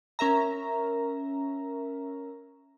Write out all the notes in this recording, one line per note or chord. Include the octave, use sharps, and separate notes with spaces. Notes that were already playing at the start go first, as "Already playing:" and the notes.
C#4 A#4 E5 A#5